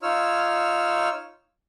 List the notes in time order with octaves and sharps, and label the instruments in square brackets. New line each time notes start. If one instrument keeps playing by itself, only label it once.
[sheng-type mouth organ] D#4 F4 C#5 E6 F6